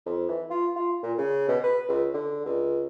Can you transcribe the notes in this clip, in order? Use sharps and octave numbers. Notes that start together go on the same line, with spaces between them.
F2
E3
F4
F4
A#2
C#3
B2
B4
C#2
D3
C#2